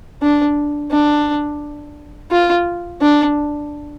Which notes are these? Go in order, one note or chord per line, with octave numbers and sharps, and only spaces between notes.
D4
D4
F4
D4